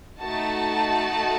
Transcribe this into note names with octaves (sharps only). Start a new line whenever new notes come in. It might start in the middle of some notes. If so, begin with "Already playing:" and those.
A3 D#4 F#4 A5